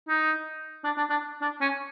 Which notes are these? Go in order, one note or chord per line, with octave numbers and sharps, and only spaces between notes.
D#4
D4
D4
D4
D4
C#4